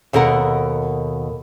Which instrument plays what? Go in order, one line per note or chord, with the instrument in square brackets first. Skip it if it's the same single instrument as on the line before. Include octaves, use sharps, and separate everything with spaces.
[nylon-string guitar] D#2 B2 A4 A#4 F#5